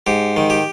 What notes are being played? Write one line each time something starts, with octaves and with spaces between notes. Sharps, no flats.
G#2 G4
D#3
G4